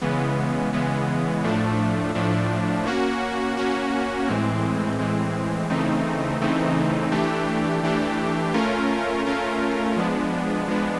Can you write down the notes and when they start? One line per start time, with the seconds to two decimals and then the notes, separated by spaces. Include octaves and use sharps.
0.02 C#3 E3 G#3 B3
0.73 C#3 E3 G#3 B3
1.44 A2 F3 A3 D4
2.15 A2 F3 A3 D4
2.86 A#3 C#4 F#4
3.57 A#3 C#4 F#4
4.28 A2 E3 G#3 C4
4.99 A2 E3 G#3 C4
5.70 C#3 E3 A3 C4 D#4
6.41 C#3 E3 A3 C4 D#4
7.12 E3 A3 D4 G4
7.83 E3 A3 D4 G4
8.54 A3 C#4 F4 A#4
9.26 A3 C#4 F4 A#4
9.96 F3 G#3 B3 D4
10.67 F3 G#3 B3 D4